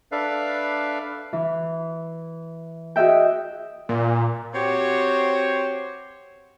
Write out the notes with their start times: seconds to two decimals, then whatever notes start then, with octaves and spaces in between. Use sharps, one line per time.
0.12 D4 A4 B4 D5 E5 F5
1.33 E3
2.96 F#4 G#4 D#5 E5 G5
3.89 A#2
4.54 C4 F#4 G4 C5 C#5